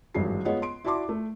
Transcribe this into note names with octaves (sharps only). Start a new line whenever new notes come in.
G#1 G2 E3 F#3 G#3 C7
G#3 B3 F4 C#5 D#5 F#5
C6 D7
E4 F#4 D5 A5 C6 D6
A3